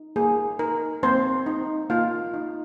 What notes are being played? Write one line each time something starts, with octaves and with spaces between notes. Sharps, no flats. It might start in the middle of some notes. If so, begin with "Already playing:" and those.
Already playing: D#4
A#3 G#4
D#4 A#4
A#3 C4 C5
D#4
A#3 F4 F5
D#4